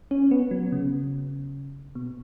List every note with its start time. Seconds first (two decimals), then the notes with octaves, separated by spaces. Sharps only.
0.11 C#4
0.31 B3
0.51 F#3
0.72 C#3
1.95 B2